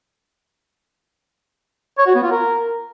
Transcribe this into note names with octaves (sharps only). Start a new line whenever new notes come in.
C#5
F#4
B3
F4
A#4